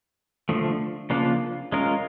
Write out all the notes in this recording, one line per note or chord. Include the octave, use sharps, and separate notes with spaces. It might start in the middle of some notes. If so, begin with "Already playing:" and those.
D3 F3 A3
C#3 F3 A#3 D4 F4
G#3 C#4 F4 A#4